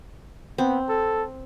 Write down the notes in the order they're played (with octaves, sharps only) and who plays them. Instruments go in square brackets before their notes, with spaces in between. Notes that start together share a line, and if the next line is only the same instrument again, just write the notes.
[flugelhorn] B3 [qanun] C4
[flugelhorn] A4